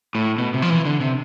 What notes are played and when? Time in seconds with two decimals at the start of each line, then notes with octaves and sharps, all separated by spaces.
0.15 A2
0.38 B2
0.54 C3
0.62 F3
0.70 E3
0.85 D3
1.01 C3